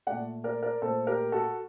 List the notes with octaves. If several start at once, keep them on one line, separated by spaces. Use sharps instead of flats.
A#2 A3 D5 F#5
A#4 D5
A#4 D5
A#2 A3 A4 C5
G4 A#4
F#4 A4